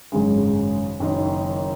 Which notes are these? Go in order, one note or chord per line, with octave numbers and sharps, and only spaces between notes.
G#1 F#2 C#3 G#3
F#1 F#2 D#3 A#3 D#4